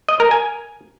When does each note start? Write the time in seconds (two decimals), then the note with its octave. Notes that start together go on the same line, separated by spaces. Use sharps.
0.09 D#5
0.20 A#4
0.31 G#5